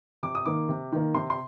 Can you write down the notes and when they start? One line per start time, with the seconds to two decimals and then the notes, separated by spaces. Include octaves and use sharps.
0.23 C3 D6
0.35 D#6
0.45 D#3 A#3 D6
0.69 C3
0.92 D#3 A#3
1.14 C3 C6
1.30 C6